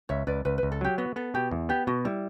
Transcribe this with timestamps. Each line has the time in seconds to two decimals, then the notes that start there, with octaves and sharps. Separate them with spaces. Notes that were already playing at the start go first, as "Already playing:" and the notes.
0.09 C#2 C#5 E5
0.27 C#2 B4 D5
0.45 C#2 B4
0.58 B4
0.63 C#2
0.72 A4
0.81 F#3 G4
0.98 B3 F#4
1.16 B3 A4
1.34 B2 G4
1.51 E2
1.69 B3 G4
1.87 B2 F#4
2.05 G3 E4